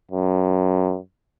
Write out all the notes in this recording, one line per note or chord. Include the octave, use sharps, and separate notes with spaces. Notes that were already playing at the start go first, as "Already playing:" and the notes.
F#2